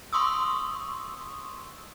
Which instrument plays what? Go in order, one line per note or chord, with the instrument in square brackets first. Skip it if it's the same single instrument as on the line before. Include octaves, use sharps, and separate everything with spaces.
[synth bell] C6 C#6 D#6 E6